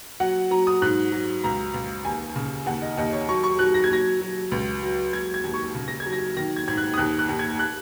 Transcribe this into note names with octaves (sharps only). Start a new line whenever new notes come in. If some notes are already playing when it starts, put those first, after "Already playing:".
F#3 F#5
F#3 A#5
D#6
G#2 F#6
F#3
C#2 A#5
C#2
D#2 G#5
C#3
D#2 F#5
D#5
D#2 D#5
C#5
F#3 C#6
C#6
F#3 F#6
A#6
G#6
F#3 A#6
F#3
C#2
F#3
F#3 G#6
G#6
D#2
C#6
C#3
A#6
G#6
F#3
A#6
D#3 A#6
G#6
G#2 G#6
F#6
D#6
D#2 F#6
F#6
D#2
G#6
F#6